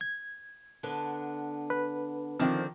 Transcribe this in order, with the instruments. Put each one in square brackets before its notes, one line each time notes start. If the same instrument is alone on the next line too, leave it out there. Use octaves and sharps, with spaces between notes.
[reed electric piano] G#6
[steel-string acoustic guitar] D3 B3 D4
[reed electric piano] B4
[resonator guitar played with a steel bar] D3 C4 [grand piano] D#3 F3